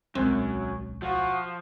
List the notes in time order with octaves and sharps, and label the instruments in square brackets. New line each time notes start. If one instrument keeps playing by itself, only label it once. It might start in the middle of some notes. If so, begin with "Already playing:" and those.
[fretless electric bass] D1 B1 G#3 [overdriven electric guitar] F#2 [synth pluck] C4
[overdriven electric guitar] F3 [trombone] F#4